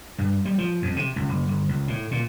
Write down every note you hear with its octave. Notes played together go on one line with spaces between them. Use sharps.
G2
G3
F3
F2
C3
C#2
F#1
G1
C#2
A2
A#2